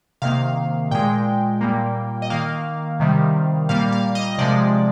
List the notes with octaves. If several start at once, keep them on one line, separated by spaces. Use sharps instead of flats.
C3 D#3 A#3 F5
A#2 G#3 G5
A#2 G3 A#3
D#5
D#3 A#3 F5
C3 D#3 G3
A#2 G3 A#3 F5
F5
D#5
C3 F3 G#3 D5